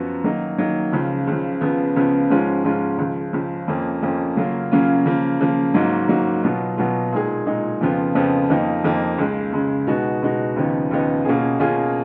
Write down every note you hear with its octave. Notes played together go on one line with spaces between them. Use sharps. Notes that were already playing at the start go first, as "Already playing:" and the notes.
Already playing: F#2 F3 B3 F#4
D#3 F#3 A#3 D#4
D#3 F#3 A#3 D#4
C#2 C#3 F3
C#2 C#3 F3
C#2 C#3 F3 B3
C#2 C#3 F3 B3
G#2 F3 G#3 C#4 F4
G#2 F3 G#3 C#4 F4
C#2 C#3 F3
C#2 C#3 F3
F2 F3 A#3 C#4
F2 F3 A#3 C#4
C#3 F#3 A#3 C#4 F4
C#3 F#3 A#3 C#4 F4
C#3 F3 A#3
C#3 F3 A#3
G#2 F#3 A#3 D#4 F#4
G#2 F#3 A#3 D#4 F#4
B2 F#3 B3 F4
B2 F#3 B3 F4
A#2 G#3 D#4 G#4
A#2 G#3 D#4 G#4
F2 C#3 F3 B3 F4
F2 C#3 F3 B3 F4
F2 F3 A#3 D#4
F2 F3 A#3 D#4
C#2 C#3 G#3
C#2 C#3 G#3
B2 G#3 B3 D#4 F#4
B2 G#3 B3 D#4 F#4
D#2 C#3 F3 B3 D#4
D#2 C#3 F3 B3 D#4
B2 A#3 C#4 F4 G#4
B2 A#3 C#4 F4 G#4